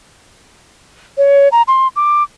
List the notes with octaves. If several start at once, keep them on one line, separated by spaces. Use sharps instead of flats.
C#5
A#5
C6
D6